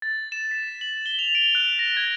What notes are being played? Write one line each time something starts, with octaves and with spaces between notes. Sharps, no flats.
A6
E7
B6
F#7
G7
F7
D7
F#6
A#6
G#6